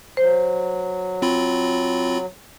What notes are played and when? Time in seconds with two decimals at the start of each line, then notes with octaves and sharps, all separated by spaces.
0.17 F#3 C5
1.22 C4 F4 B5